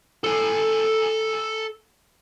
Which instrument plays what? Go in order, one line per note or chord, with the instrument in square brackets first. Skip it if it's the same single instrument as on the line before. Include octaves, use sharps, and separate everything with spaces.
[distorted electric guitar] A4 G#5